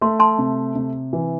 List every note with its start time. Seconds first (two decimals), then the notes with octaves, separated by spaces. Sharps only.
0.01 A3 C6
0.20 A5 C6
0.39 C3
0.75 C3
1.13 E3